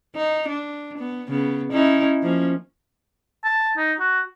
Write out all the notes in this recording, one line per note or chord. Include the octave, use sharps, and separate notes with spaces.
D#4
D4
B3
C#3 B3
C#4 D#4 E4
F3 A#3 C#4
A5
D#4
F#4